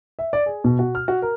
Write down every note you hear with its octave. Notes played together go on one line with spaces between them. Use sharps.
E5
D5
G#4
B2
F#4
F6
F#4
A#4